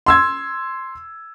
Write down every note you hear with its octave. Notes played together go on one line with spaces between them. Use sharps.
C6 E6 G#6